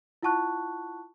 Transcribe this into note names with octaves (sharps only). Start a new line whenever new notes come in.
E4 F4 F#5 A5 C#6 F#6